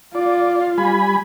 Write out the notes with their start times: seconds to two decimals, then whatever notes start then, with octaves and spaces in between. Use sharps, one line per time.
0.15 F4 D5
0.78 G3 G#5 B5